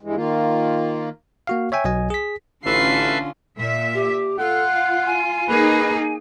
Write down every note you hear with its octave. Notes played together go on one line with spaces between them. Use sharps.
G2 E3 G#3
D#3 A#3 F4
A#3 F#4 F5
C#5 E5 G5 G#5
B1 F#3 D#5 G#5
G#4 B6
A1 D3 C#4 F4 A4 B4 E5 C7
A#2 E5
G4
F4 A4 F#5
F5
G#5
A#3 D#4 G#4 B4